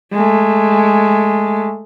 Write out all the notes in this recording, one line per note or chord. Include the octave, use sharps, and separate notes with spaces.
G#3 A3